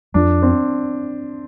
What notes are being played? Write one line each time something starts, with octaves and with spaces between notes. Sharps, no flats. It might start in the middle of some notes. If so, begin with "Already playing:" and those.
F2 D4
C4